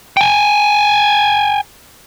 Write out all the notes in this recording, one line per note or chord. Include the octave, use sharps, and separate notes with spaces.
G5 G#5